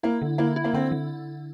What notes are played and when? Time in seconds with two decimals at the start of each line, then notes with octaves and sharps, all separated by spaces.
0.03 A#3 E4
0.22 D3
0.38 A#3 E4
0.56 E4
0.64 A#3
0.73 D3 C4
0.91 D3